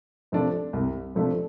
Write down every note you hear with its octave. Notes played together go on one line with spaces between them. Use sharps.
C3 F3 A3 D4
C2
C3 F3 A3 D4